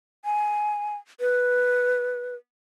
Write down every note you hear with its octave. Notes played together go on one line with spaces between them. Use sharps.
G#5
B4